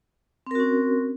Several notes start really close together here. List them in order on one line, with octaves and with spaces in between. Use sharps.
C4 A#4 F#4 C#4